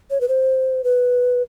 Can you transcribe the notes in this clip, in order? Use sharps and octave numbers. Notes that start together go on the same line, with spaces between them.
C#5
B4
C5
B4